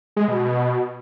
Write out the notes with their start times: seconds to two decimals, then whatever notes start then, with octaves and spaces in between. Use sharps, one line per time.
0.17 G#3
0.28 B2
0.39 B2